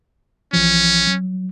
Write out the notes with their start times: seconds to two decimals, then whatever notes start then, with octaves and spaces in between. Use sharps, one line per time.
0.53 A1 E3 F3 C#4
1.07 F#3